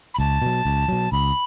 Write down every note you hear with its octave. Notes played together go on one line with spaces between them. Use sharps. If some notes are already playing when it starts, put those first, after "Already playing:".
B5
C#2 A5
B2 F#3
C#2
B2 F#3
C#2 B5